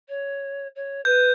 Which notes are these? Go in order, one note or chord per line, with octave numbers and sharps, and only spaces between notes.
C#5
C#5
B4 G6